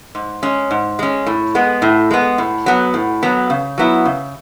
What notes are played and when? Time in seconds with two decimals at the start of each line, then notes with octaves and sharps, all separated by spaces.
0.15 G#2
0.43 G#3 C#4
0.71 G#2
0.99 G#3 C#4
1.26 A2
1.55 G#3 B3
1.82 A2
2.11 G#3 B3
2.38 A2
2.66 F#3 B3
2.94 A2
3.23 F#3 B3
3.50 C#3
3.78 F#3 B3 E4
4.05 C#3